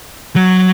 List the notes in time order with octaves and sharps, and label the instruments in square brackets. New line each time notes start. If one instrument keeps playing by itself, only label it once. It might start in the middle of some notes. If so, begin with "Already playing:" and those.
[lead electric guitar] F#3